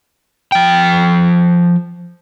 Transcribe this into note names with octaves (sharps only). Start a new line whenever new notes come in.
F3 G5